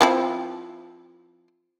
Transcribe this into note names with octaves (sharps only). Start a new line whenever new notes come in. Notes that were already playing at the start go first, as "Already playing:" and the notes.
F3 C4 E4